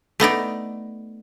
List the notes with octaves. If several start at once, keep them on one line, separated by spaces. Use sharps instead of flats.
A3 B3 D#4 D5